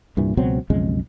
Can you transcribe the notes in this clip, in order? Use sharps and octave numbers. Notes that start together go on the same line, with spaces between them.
C2 G2 A#2 E3
C#2 B2 F#3 C4
B1 F2 C#3 G#3